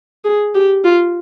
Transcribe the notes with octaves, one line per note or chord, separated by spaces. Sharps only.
G#4
G4
F4